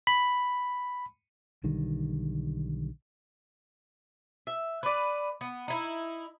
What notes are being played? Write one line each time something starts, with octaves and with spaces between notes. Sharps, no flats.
B5
B1 D3 D#3 G3
E5
B4 D5
B3
D#4 E4